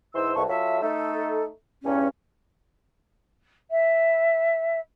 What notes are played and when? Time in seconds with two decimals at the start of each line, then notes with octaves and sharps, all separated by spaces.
0.14 G#2 E3 C5 C6 E6
0.36 C2 G#3 E4 A4 B4 C#6
0.49 F#3 F4 A4 E5
0.82 A3 D#4 A4
1.84 E2 G2 C#4
3.71 E5